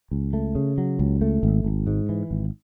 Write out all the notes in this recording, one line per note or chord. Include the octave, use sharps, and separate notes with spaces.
C#2
A3
C#3
F#3
C#2
A3
G#1
G#1
G#2
E3
G#1